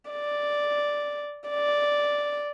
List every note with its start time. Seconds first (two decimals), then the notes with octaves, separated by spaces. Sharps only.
0.11 D5
1.50 D5